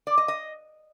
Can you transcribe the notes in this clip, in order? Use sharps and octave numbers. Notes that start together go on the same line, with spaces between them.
D5
D#5
D#5